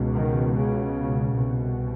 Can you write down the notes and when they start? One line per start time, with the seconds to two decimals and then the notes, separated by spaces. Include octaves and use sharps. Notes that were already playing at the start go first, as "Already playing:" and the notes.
Already playing: C#2 B2
0.14 D#3
0.55 C#3
1.34 C2 B2